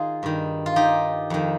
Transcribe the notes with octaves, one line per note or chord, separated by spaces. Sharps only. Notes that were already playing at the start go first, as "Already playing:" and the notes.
Already playing: D#3 D#4 F4 G#4
G2 D#3
F4
D#4 G4
F2 D#3